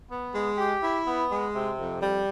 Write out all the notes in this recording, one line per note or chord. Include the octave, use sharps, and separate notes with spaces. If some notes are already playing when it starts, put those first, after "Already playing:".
B3
G#3
G4
E4
B3
G#3
C3
F2
G3